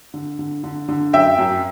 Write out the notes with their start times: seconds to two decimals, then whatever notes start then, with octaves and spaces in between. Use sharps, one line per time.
0.14 D3
0.39 D3
0.64 D3
0.89 D3
1.13 F#2 E5 G5
1.38 F#2